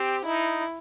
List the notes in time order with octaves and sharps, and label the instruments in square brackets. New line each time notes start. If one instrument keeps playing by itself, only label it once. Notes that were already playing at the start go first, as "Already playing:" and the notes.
Already playing: [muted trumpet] C4 [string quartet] G4
[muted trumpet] D#4 [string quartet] E4